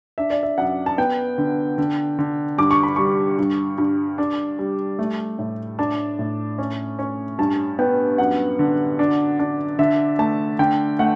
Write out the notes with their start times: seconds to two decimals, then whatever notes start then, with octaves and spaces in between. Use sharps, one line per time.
0.18 D4 E5
0.30 D5
0.43 E5
0.58 F#2 F#5
0.86 A5
0.98 B3 G5
1.38 D3
1.78 D3
2.19 D3
2.58 G2 D6
2.71 C#6
2.83 B5
2.96 G3 C#6
3.38 G2
3.78 G2
4.18 D4
4.59 G3
4.99 A3
5.39 A2
5.79 D4 A5
6.19 A2
6.58 C#4
6.99 C#4
7.39 G2 A5
7.79 B3 G5
8.18 F#2 F#5
8.59 D3
8.99 D4
9.39 D4
9.79 D3 E5
10.19 A3 A5
10.59 D3 G5
10.99 A3 F#5